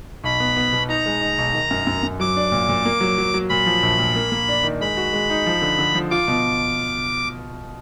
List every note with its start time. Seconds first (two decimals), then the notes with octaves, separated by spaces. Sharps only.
0.24 B1 B5
0.40 B3
0.56 B3
0.73 B2
0.89 D#4 A#5
1.06 G#3
1.21 D#4
1.38 B1
1.54 D#3
1.71 F#2
1.87 F#2
2.03 F#2
2.20 F#3 D6
2.37 D4
2.52 A#2
2.68 A#2
2.85 A#3
3.01 F#3
3.18 F#3
3.34 F#3
3.50 A#2 B5
3.66 F3
3.83 A#1
3.98 A#2
4.16 A#3
4.32 A#3
4.49 D4
4.64 D#3
4.81 G#3 B5
4.97 F#4
5.13 G#3
5.30 D#4
5.46 F3
5.62 D3
5.79 D3
5.95 F3
6.11 F4 D6
6.28 B2